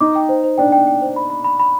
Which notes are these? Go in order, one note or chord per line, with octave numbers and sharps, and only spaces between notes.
D#4 D6
G5
C5
C5
D4 G5
G5
G5
C5
B5
B5
B5
B5